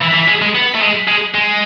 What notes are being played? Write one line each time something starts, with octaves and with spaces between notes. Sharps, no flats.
E3
E3
G#3
G#3
B3
A3
G#3
G#3
G#3